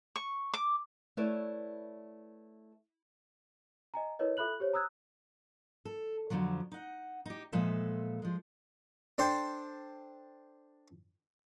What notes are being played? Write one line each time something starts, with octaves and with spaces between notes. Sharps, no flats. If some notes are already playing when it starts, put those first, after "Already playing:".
C#6
D6
A3 E4 B4 C#5 D5 E5
D#5 G#5 A#5
E4 A#4 B4 C#5 D#5
F4 A4 E5 B5 F#6 F#7
G4 C5 C#5
A#5 D#6 E6 F#6 G#6
A4
F2 G#2 D3 F3 F#3
D#4 F#5
D#4 G4
A#2 F3 G#3 A4 B4 E5
F3 G#3
D4 A4 C5 G5